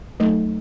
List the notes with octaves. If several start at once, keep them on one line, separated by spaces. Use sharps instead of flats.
F#3 A3 D#4 A4